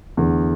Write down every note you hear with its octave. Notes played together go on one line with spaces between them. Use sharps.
E2 D3 A3